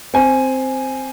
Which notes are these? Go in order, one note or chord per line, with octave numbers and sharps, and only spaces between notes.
C4 G#5